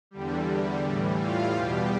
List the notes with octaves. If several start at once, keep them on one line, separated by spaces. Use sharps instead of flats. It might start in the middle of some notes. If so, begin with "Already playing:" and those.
E2 D3 G3
A2 E3 G3
F4 F5
E2 B2 G3 G4